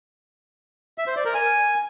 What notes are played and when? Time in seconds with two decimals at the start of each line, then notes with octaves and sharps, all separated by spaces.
0.98 E5
1.07 C5
1.16 D5
1.25 A#4
1.34 G#5